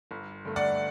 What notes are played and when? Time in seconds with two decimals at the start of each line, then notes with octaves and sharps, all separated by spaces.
0.11 G1
0.45 G2 D3 A3
0.56 D5 F#5